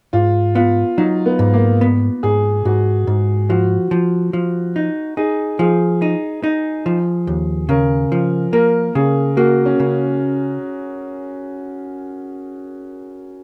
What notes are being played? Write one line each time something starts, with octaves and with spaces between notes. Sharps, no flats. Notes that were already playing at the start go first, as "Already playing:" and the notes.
G#2 F4
B3 F4
F#3 D#4
B3
G#2
A#3
B3
G#2 G#4
G#2 F#4
G#2
F3 F#4
F3
F3
D#4
D#4 G#4
F3 G#4
D#4
D#4
F3
D#2
C#3 A#4
F3
A#3 A#4
C#3 G#4
A#3 F#4
C#4
C#3